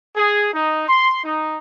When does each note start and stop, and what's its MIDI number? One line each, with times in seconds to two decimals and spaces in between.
0.16 0.53 68
0.53 0.86 63
0.88 1.22 84
1.24 1.59 63